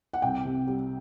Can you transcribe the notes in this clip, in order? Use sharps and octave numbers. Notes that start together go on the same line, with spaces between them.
F#5
C2 G5
C3
G3